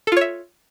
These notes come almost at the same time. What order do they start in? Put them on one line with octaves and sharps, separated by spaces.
A4 F4 C#5 E5